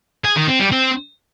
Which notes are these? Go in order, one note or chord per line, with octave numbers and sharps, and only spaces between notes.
G#4
D#3
C4
G3
C4